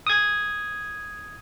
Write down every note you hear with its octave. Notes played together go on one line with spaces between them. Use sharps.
D#6 G#6